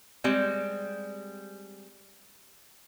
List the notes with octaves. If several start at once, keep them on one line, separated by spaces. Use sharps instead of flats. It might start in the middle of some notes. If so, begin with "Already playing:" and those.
G3 G#3 C4